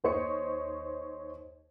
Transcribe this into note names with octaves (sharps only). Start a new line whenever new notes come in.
D#2 C5 C#5 D#5 C#7